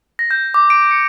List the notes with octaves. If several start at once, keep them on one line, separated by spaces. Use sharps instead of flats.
A#6
G6
D6
D7
C#7